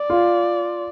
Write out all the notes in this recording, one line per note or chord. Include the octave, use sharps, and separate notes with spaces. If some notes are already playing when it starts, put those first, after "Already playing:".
Already playing: D5
F4